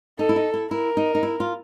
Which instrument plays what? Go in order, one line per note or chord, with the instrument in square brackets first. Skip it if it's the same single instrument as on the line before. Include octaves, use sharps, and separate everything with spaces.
[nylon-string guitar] D#4 [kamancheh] A4
[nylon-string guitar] E4
D#4
E4
[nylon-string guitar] E4 [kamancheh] A#4
[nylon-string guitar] D#4
D#4
E4
F4